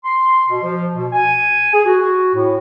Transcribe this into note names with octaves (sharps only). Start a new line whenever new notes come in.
C6
B2
F3
B2
G#5
G#4
F#4
A2